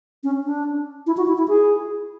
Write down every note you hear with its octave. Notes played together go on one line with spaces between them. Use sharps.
C#4
D4
E4
F#4
E4
E4
G#4